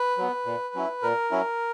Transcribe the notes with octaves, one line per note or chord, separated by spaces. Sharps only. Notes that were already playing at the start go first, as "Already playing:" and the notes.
Already playing: B4
F#3 B3
A#2
F#3 C#4 E4
A#2 A#4
F#3 C#4 E4